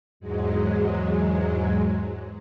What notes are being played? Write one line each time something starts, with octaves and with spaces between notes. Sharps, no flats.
E2 G#2 F#3 G#3